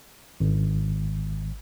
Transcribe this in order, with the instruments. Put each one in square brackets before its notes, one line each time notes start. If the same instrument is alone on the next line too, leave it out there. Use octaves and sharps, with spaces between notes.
[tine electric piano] G#1